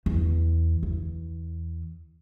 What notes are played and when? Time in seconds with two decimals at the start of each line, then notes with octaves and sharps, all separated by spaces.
0.06 E2
0.83 E2